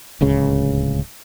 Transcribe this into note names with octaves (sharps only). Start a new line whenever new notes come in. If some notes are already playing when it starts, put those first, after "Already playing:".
D1 C#2 C#3